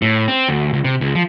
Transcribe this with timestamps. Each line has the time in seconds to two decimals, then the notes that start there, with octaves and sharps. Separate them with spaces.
0.02 A2
0.28 C4
0.49 D2
0.73 C#2
0.84 C3
1.01 C#2
1.15 F3